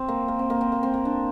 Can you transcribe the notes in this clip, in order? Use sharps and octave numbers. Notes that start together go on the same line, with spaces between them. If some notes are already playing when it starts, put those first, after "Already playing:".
Already playing: C4
A#3
A#3
C4
A#3
C4
A#3
C4
A#3
D4